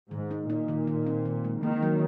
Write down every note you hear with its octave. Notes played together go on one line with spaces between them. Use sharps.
G#2 D#3
D#4
A#2 D#4
D#3
D#3
C4
D#3
G#3
D#3 A#3
F#3